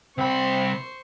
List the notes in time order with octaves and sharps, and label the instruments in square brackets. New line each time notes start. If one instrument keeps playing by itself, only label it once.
[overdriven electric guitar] C2 B5 [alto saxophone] C4 [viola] C5 C#6